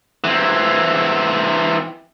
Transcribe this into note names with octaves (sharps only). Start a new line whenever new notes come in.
E3 C4